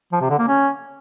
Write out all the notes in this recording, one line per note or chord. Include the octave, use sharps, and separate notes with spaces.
F3
C3
D3
A#3
C#4